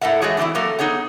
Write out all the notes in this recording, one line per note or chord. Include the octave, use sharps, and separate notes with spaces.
A2 A4 A#4 E5 F#5
E3 G#3 A3 F#4 G#4 C#5
D3 E3 B3 C4 E4
F#3 A3 A#3 F#4 A4 A#4
B3 D#4 G#4 C#5 F#5